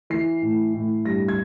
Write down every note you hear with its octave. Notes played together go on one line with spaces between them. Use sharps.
E3 C7
A2
A2
G2 A#6
G#6